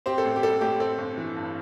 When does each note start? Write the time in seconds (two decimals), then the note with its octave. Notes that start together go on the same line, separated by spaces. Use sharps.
0.06 C4 G4 C5
0.18 A4
0.24 A1
0.36 G4
0.43 G3 A4
0.61 A2 G4
0.80 C4 A4
0.98 G1
1.18 E3
1.36 G2